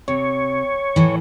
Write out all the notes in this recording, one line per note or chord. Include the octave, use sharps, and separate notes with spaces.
C3 C#5
A2 E3